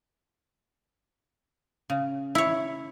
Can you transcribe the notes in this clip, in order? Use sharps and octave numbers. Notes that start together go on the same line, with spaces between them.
C#3
E4 C#5